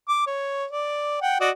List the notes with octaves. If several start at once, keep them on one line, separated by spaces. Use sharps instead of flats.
D6
C#5
D5
F#5 G5
F#4 D5 D#5